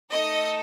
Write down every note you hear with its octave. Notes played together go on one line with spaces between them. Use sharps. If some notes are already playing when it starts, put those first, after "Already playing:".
A3 D#4 A4 D#5